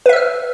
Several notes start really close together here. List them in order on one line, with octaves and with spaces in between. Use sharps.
B4 E5 E6 F6